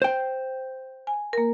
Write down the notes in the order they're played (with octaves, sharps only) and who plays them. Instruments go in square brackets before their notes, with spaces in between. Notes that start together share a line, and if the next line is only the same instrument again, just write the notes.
[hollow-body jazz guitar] C5 G5
[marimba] G#5
A#3 A#4